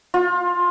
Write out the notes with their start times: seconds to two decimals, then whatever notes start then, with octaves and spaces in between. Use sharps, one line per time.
0.14 F4